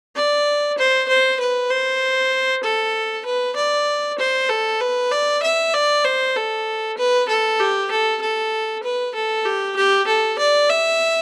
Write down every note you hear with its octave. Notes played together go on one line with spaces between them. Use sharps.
D5
C5
C5
B4
C5
A4
B4
D5
C5
A4
B4
D5
E5
D5
C5
A4
B4
A4
G4
A4
A4
B4
A4
G4
G4
A4
D5
E5